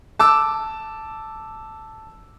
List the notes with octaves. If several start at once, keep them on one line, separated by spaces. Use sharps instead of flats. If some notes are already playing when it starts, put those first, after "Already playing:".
A5 D6 E6